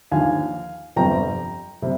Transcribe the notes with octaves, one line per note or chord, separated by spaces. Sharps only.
D#2 D3 F3 F5 G#5
G1 F2 C3 G3 G5 A#5
C3 G3